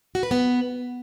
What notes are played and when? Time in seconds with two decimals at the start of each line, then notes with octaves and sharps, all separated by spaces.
0.15 F#4
0.23 B4
0.31 B3